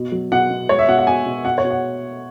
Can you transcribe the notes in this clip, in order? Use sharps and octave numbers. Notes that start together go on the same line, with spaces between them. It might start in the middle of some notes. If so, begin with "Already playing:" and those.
Already playing: B2
F#3
B2 F#5
B2
G#3 C#5
E5
B2 F#5
F#5
B2 G#5
B2
B2 F#5
C#5
B2
F#5